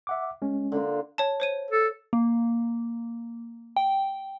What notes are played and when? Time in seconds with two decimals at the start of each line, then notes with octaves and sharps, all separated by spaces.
0.07 E5 F#5 D6
0.42 G#3 C#4
0.72 D3 A#3 F4
1.18 C#5 A5
1.40 C5 C#5 D#7
1.71 A4
2.13 A#3
3.76 G5